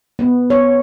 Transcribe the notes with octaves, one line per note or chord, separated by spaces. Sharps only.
B3
C#5